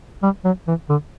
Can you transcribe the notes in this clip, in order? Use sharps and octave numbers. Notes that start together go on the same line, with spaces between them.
G3
F#3
E3
D3